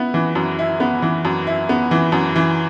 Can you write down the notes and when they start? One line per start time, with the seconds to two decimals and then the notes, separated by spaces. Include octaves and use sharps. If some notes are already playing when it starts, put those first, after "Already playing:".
Already playing: B3 E4
0.14 E3
0.35 F#2
0.59 E4
0.80 B3
1.02 E3
1.25 F#2
1.47 E4
1.69 B3
1.91 E3
2.12 F#2
2.36 E3